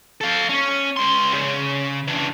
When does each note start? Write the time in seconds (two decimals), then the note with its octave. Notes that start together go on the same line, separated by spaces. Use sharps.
0.21 A4 F5
0.49 C#4
0.96 C#2 C6
1.33 C#3
2.08 E3 D4